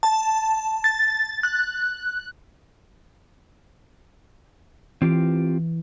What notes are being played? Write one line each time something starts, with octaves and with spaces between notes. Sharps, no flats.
A5
A6
F#6
E3 C4 F4 G4